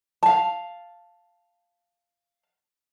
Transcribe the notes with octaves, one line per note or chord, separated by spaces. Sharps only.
F5 A5